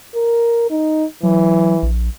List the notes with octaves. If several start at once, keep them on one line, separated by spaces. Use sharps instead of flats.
A#4
D#4
E3 F#3
A#1